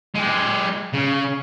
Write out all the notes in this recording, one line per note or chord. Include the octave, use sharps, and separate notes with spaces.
G#3 G4
C#3